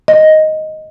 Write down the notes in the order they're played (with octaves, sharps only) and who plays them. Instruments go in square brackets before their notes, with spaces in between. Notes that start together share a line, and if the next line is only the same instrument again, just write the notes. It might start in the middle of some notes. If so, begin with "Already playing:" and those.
[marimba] D#5